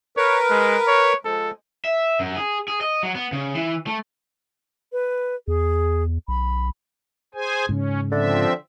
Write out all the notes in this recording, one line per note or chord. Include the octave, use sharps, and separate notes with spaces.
A#4 B4 C#5
G#3
C#5
F3 G#3 A4
E5
F#2
G#4
G#4
D#5
F#3
B3
C#3
E3
A3
B4
E2 G#4
B1 B5
G#4 C5 G#5
G#2 C#3 C#4
D3 F3 C4 E5